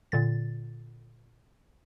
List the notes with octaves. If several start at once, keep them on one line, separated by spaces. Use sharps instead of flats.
A#2 D3 A6